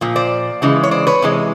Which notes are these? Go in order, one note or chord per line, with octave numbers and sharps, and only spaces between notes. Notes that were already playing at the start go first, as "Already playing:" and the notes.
A#2 F3
C5 D5
C#3 E3 G#3
C#5
C5 D5
B4 C#5
C3 E3 G#3